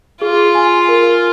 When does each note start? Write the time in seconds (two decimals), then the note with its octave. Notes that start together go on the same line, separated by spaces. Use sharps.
0.21 F4 G#4
0.55 G#5
0.89 A#4